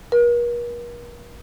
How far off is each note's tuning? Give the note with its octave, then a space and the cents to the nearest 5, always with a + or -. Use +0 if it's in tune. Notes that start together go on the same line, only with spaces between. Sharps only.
A#4 +45